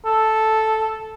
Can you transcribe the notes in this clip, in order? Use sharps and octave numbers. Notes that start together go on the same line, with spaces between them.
A4